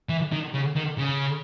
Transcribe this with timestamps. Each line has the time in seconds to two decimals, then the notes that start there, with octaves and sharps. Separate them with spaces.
0.09 E3
0.32 D#3
0.54 C#3
0.76 D#3
0.98 C#3